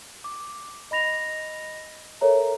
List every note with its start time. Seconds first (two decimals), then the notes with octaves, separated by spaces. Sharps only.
0.24 D6
0.91 D#5 B5 A#6 F7
2.21 A4 A#4 C#5 E5 A#5